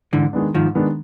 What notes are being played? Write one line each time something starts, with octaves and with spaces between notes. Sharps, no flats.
G#2 D3 E3
D#3 G#3 B3 D4
G#2 D#3 F3
D#3 G#3 B3 D4